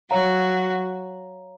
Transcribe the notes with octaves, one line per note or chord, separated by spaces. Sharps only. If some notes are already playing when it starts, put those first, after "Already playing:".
F#3 F#4 C#5 F5 A#5